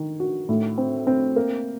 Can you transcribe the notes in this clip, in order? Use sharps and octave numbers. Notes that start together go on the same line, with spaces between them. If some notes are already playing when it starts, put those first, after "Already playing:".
Already playing: D#3
F#4
A2
C4
C4
A#3